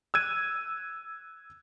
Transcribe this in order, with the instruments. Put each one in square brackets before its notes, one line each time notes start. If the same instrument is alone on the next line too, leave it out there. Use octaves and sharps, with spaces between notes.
[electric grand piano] E6 F#6 G#6 D#7